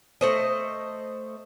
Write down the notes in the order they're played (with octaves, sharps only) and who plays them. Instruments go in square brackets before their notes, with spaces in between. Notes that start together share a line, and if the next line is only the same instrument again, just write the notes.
[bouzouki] A3 C5 D#5